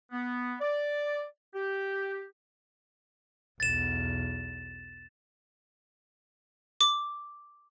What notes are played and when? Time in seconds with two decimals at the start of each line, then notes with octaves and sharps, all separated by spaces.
0.12 B3
0.61 D5
1.55 G4
3.60 B1 E2 A6 E7
6.81 D6